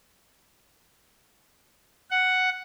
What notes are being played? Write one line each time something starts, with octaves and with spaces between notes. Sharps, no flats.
F#5